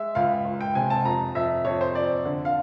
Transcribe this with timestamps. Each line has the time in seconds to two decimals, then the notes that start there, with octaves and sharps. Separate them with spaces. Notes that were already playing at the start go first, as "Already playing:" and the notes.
Already playing: G#3 E5
0.15 C#2 F5
0.45 C#2
0.61 G5
0.75 C3 G#5
0.90 A5
1.05 F2 A#5
1.35 F2 E5
1.65 F2 C#5
1.81 C5
1.95 F2 D5
2.25 D3
2.45 F5